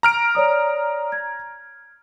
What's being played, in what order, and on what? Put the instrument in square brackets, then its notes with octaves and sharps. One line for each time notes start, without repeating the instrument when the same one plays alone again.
[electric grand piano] A#5 F6 D7
[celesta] C#5 D5 D#6
G#6